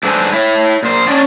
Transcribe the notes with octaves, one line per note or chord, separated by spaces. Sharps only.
G#2 D4 A4 B4 C5 G#5
E4 C#5 E5
A#2 C5
C#4 D4 D5